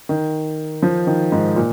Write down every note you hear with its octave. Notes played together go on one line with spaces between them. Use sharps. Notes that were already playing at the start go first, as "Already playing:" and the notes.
D#3
F3
D#3
G#2
A#2